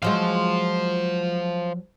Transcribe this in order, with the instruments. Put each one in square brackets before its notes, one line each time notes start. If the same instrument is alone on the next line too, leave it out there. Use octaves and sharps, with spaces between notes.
[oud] F3 F#3 G#3 [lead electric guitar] C5 F5